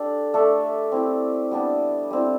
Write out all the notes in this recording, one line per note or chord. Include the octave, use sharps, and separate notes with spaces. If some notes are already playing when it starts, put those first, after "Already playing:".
Already playing: D4 G4 A4 D5
A3 D4 A4 E5
C4 E4 G4
G3 B3 D4 G4
G3 C4 E4